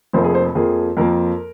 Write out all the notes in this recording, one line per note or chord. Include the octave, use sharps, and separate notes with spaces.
F1 F2 F3 A#3 C5
G#4
C5
F2 F3 A#3 G#4
F2 F3 A#3 A#4